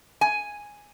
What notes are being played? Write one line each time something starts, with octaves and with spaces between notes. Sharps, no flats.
G#5